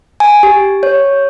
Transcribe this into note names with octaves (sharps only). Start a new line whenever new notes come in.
G#5
G4
C#5